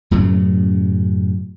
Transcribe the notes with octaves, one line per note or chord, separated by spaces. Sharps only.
F#2 A2 C#3 F#3